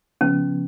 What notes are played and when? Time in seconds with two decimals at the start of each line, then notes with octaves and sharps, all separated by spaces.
0.21 C#3 F3 B3 C#4